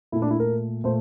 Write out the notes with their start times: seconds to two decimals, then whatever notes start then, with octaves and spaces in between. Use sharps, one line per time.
0.12 A#2 A3 E4
0.22 D4
0.30 E4
0.40 A#4
0.84 A#2 A3 C5